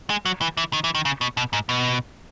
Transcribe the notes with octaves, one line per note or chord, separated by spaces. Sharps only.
G#3
F#3
E3
E3
D#3
E3
D#3
C#3
B2
B2
G#2
B2